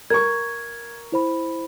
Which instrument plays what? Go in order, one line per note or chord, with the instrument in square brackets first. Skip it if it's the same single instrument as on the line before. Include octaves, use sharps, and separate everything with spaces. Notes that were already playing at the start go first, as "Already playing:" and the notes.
[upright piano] A#4 C#6 [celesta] G#6
[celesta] E4 C5 B5